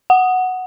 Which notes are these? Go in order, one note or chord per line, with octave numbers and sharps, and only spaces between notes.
F#5